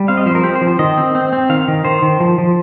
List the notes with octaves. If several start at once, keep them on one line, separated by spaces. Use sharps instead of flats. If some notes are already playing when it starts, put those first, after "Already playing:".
Already playing: G3
C4 F5
D#5
F3 C5
A#4
C4 G4
C5
F3
C5
D#3 D#5
C4
C4
C4
D#3 F5
D#3
D#3 C5
D#3
F3
F3